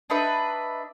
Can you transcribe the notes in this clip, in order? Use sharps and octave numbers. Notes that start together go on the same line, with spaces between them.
D4 D#4 B4 E5